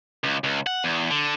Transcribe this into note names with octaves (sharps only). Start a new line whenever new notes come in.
C#2
C#2
F#5
E2
D3